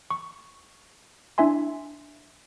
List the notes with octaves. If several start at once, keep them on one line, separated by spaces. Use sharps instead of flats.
C#6
D4 E4 E5 G#5 C6